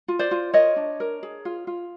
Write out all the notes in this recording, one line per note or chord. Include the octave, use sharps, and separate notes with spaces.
F4
C5 D5
F4
A#4 C#5 D#5
D4
A#4
G#4
F4
F4